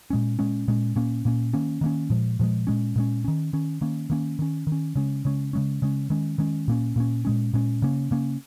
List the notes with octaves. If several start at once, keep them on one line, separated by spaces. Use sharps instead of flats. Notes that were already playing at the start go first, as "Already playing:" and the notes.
A#2 G#3 C#4
A#2 G#3 C#4
A#2 G#3 C#4
A#2 A#3 C#4
A#2 A#3 C#4
D#3 A#3 C#4
D#3 A#3 C#4
A#2 F3 G#3
A#2 F3 G#3
A#2 G#3 C#4
A#2 G#3 C#4
D#3 C#4
D#3 C#4
D#3 A#3 C#4
D#3 A#3 C#4
D#3 C#4
D#3
C#4
C#3 G#3 C#4
C#3 G#3 C#4
C#3 G#3 C#4
C#3 G#3 C#4
D#3 G#3 C#4
D#3 G#3 C#4
A#2 A#3 C#4
A#2 A#3 C#4
A#2 G#3 C#4
A#2 G#3 C#4
C#3 A#3 C#4
C#3 A#3 C#4